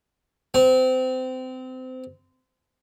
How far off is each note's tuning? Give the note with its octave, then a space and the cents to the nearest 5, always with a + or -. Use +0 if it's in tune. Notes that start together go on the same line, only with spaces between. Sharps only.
C4 -25